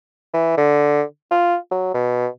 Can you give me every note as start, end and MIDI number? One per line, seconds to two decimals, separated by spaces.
0.34 0.57 52
0.57 1.03 50
1.31 1.57 65
1.71 1.90 54
1.94 2.27 47